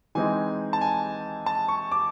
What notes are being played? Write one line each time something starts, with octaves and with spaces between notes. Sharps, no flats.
E3 G#3 C4 D#4 G#5
A5
G#5
A5
C#6
D6